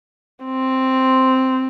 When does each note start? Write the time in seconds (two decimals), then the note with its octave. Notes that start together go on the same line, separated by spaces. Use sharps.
0.44 C4